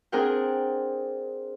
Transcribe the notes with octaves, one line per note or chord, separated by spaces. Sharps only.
C4 D4 G#4 A#4 F#5 G5